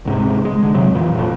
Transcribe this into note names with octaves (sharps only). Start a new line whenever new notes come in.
C#2 G#2 C3
G#3
D3
F2 C3 F#3
A#2 E3
F#1 F2